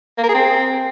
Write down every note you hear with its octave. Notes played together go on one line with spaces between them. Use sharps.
A#3
A#4
G#4
C4